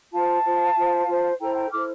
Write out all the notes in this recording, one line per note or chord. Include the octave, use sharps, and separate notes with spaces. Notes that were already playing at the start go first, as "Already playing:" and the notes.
F4 C5 F5 A5
F4 C5
F4 C5
F4 C5
E4 A4 C5 G5 A#5
G5 A#5
E4 A4 C5 D6 F6